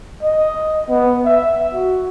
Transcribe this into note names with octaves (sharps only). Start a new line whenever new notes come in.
D#5
B3
E5
F#4